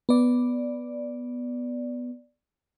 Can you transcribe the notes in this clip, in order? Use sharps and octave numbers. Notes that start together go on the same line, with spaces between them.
B3 D5